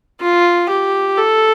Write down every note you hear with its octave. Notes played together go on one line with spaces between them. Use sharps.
F4
G4
A4